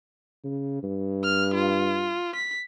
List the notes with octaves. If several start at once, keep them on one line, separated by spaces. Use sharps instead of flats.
C#3
G2
F6
F4
B6